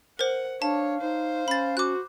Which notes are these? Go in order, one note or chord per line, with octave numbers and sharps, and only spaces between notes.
A#4 C5 F#5
D4 C#5 F5 A5
D#4 C5
C#4 B5 A6
F#4 D6 F#6